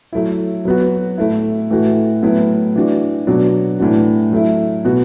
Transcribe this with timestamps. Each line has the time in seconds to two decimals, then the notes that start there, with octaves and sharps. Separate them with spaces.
0.13 F#3 A3 E4
0.65 F#3 B3 F#4
1.18 A2 A3 E4
1.70 A2 E3 A3 F#4
2.23 A2 F#3 B3 E4
2.76 E3 D4 F#4
3.27 B2 F#3 D4 F#4
3.79 A2 E3 D4 F#4
4.32 F#3 A3 E4
4.85 B2 B3 F#4